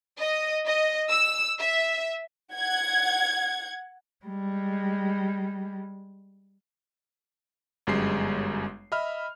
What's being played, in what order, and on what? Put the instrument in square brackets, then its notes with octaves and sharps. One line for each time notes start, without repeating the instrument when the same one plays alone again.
[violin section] D#5
D#5
E6
E5
[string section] F#5 G#6
[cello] G3 G#3
[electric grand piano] G1 F#2 G3 G#3 C7
D#5 E5 B5 F6